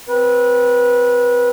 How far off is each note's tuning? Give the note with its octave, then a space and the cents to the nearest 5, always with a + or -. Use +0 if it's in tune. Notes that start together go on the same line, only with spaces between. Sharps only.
C4 +0 B4 -25